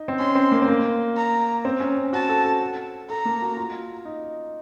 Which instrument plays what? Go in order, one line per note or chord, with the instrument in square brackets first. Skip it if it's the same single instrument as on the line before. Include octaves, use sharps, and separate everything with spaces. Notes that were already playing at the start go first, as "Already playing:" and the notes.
Already playing: [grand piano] D#4
C4
[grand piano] C#4 [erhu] C6
[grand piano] C4
A#3
C4
A#3
[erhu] A#5
[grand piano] C4
C#4
C#4
[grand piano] F#4 [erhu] A5
[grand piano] A4
A4
[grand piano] A4 [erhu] A#5
[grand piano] A#3
F#4
F4
D#4